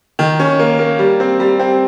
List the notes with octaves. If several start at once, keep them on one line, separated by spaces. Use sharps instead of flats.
D#3
C#4
A#3
A#3
G3
C4
G3
C4